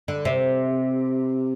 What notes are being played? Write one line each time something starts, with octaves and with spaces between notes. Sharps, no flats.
D3
C3